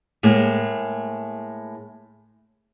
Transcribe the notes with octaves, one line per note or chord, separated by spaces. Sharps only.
A2 G#3 A#3